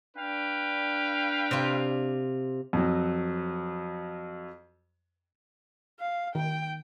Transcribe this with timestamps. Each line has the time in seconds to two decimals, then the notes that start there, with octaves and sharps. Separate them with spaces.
0.17 D4 B4 F5 G5
1.51 C3 F4
2.73 F2 F#3
6.00 F5
6.35 D#3 G5